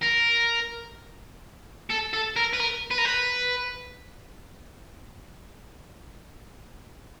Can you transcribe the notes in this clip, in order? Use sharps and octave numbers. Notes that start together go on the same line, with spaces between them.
A#4
A4
A4
A#4
B4
A#4
B4
A#4
B4